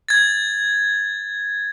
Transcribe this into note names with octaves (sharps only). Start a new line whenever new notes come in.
G#6 A6